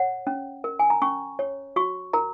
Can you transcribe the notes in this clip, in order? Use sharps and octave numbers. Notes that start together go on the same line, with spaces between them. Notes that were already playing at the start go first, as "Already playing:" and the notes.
Already playing: C#5 F#5
C#4
A#4
G#5
A#5
C#4 C#6
C#5
F#4 C#6
A#4 A#5